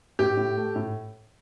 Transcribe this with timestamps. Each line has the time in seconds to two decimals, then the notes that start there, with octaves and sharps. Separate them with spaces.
0.19 A2 G4
0.37 A2
0.57 A3
0.75 A2